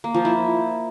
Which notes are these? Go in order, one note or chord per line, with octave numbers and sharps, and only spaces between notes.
A#3
F3
E4